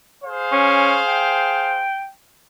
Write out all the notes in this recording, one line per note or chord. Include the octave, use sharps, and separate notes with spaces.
G#4 C5 F5
C#4
G5